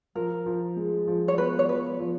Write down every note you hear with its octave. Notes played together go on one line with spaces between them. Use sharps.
F3 A#4
F3
G#3
F3
C#5
B3 B4
C#5
F3 B4
F3